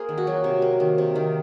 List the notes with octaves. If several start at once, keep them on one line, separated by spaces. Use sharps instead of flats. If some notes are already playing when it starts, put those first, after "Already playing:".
Already playing: A#3 G#4 A#4 C5
D#3
F#4
F#3
C3
A#3
D#3
C3
D#3